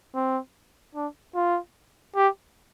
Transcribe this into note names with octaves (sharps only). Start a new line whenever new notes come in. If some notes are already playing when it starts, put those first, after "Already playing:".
C4
D4
F4
G4